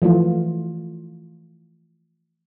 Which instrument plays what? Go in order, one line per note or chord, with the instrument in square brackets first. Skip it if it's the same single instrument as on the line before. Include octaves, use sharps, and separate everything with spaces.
[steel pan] E3 F3 A3 F4